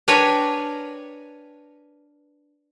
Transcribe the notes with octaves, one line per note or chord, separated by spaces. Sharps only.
D4 A#4 B4 C#5 G5 G#5